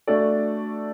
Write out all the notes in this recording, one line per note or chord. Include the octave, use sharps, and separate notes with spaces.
A3 D4 F#4 A4 D5